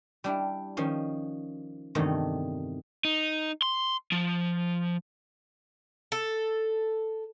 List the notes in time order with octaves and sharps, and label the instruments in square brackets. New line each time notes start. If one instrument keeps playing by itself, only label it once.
[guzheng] G3 D4 E4
D#3 F3 C#4
E2 G2 C3 D#3 A3
[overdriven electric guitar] D#4
C6
F3
[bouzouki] A4